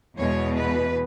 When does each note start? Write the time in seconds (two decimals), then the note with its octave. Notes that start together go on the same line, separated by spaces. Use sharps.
0.18 E2 B2 G#3 C#5
0.57 B4